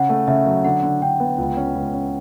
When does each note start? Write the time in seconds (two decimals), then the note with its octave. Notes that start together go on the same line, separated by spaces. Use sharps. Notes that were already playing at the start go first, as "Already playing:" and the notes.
Already playing: C#3 F#5
0.09 A3
0.27 C#3 E5
0.46 F#3
0.65 D3 F#5
0.83 D3
1.01 D3 G5
1.20 B3
1.38 C#2
1.57 C#4
1.75 C#2
1.94 C#4